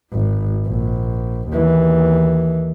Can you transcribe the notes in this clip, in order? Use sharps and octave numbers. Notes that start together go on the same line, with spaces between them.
G#1
A#1
D#2 E3